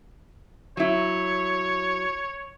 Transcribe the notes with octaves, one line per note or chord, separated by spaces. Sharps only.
F#3 E4 C#5